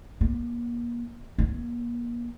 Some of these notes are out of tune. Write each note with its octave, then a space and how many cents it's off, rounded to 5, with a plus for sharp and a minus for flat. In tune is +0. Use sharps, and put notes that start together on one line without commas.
A#3 +35
A#3 +35